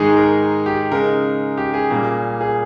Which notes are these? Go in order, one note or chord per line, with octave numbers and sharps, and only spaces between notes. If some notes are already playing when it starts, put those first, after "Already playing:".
Already playing: G#2 D#3 G#3 D#4 G#4
A#4
G4
C#3 G#3 D#4 A#4
G4
G#4
A#2 G3 A#3
G#4